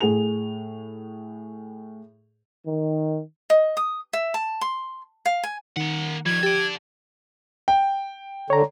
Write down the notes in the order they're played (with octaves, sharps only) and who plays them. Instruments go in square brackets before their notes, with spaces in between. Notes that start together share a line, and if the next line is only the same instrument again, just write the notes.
[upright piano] A2 G#4 F7
[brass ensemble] D#3
[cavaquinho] D#5
D#6
E5
A5
C6
F5
G#5
[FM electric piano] D#3 [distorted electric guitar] A#3 F#5
[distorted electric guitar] D#3 G3 [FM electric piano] F3 [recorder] G#6
[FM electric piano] G4 [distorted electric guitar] A4 D5
[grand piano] G5
[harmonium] D3 [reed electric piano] C#5 A#5